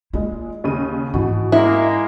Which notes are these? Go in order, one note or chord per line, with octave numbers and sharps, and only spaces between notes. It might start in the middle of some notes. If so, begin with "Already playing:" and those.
A#2 G#3 E4 F4
D#2 C#3 D#7
G#2 B2 E3
G#3 A#3 E4